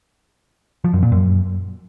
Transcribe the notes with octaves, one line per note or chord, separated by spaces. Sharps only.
F3
F#2
A#2
F#2